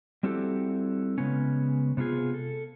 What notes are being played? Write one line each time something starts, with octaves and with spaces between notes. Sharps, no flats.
G3 C4 E4 F#4 G4 A4
C#3 G#3 B3 C#4
C3 B3 D#4 F4 G#4
A4